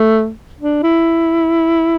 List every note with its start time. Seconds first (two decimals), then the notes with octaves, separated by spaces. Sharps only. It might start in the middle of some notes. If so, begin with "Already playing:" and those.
Already playing: A3
0.61 D4
0.83 E4